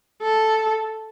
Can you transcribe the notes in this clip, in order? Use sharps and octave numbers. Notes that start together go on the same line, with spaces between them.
A4